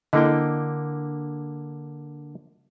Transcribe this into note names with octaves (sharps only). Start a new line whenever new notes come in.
D3 A#3 E4 A4 D#5 G5